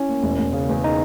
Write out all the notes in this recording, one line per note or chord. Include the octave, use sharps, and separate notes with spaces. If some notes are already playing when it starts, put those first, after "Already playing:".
Already playing: C#4 E4
A#3
E1
E1
C#3
E2
D#4